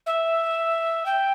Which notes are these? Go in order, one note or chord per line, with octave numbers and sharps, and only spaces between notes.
E5
G5